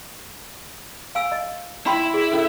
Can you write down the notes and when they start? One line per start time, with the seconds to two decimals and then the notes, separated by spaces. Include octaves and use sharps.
1.15 F5 G#5 E6
1.32 D#5
1.86 E4 G5 B5 C6
2.14 G#4
2.32 C#4 A4